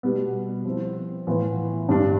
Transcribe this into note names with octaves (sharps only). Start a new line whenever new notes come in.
B2 G3 B3
F3 C4 E4
A2 E3 B3 F4 B4
G2 D3 G3 D4